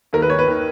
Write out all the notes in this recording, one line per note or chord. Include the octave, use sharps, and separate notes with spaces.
D#2 D#3 A#4
B4
C#5
B4
D#3